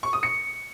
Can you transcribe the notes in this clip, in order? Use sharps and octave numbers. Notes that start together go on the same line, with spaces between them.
C#6
D#6
C#7